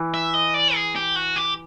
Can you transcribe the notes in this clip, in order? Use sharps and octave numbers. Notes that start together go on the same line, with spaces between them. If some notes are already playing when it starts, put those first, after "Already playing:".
Already playing: E3
E5
D#5
D5
G#4
G4
F#4
G4